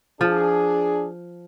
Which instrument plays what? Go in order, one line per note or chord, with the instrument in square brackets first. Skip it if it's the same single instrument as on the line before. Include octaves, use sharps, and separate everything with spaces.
[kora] F3 [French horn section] D4 G#4